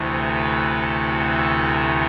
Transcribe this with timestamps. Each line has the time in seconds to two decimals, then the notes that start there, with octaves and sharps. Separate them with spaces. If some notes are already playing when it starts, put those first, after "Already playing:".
Already playing: D2 C3 E3 A3
0.36 B4
0.80 A4
1.10 F#4
1.40 A4